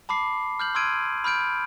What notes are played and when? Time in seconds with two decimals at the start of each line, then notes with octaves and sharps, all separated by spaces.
0.09 A5 B5 D6 C7
0.60 F6 G6 F#7
0.75 C6 E6 F6 G#6 D7 D#7
1.24 B5 F6 G6 D7